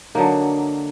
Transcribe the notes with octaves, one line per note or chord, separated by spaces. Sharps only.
D3 F#3 A#3 D#4